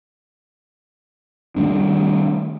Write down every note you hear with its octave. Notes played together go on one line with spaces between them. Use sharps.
D#3 G3 A3 D4